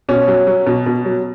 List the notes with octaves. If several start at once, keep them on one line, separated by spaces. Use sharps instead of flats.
B2 C#4
F#3
F#3
B2
B2
F#3